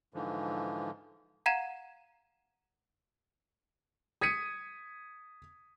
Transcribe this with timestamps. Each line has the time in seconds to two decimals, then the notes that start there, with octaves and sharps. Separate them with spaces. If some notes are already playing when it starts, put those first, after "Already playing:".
0.14 G#2 D3 E3 F3
1.46 F5 F#5 A#5 G#6 D#7 E7
4.21 D#6 G#6 B6 C#7 D#7